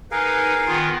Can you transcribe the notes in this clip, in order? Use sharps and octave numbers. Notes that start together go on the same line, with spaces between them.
D#4 G#4 A#4 B4 F5
D#3 B3 F4